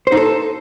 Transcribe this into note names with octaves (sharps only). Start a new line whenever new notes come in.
C5
D#4
A4